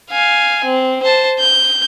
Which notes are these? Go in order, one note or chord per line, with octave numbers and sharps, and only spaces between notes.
F5 G#5
C4
C5 A5
G6